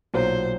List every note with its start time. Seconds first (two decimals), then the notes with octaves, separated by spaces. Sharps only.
0.14 B1 A#2 F#3 C5